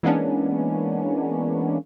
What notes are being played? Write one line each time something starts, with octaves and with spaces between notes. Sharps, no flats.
E3 G#3 A#3 B3 C#4 D4